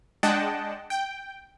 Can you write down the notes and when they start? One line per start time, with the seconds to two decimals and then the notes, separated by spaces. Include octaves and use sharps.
0.23 G#3 D4 D#5 F#5 G5 A5
0.90 G5